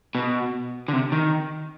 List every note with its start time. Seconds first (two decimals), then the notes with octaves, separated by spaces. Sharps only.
0.15 B2
0.88 D3
0.93 C3
1.12 D#3